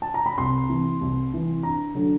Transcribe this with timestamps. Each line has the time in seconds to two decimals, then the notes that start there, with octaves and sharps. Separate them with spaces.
0.02 A5
0.14 A#5
0.26 B5
0.38 C2 C6
0.69 C3 E3
1.01 C2
1.32 C3 E3
1.63 G2 A#5
1.95 D3 F#3 A3 D4